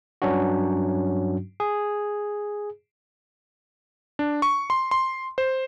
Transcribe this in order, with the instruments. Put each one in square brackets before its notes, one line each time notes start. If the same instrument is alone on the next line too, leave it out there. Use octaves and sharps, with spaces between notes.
[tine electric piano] G2 F#3 C#4 D4 F#4
G#4
[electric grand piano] D4
C#6
C6
C6
C5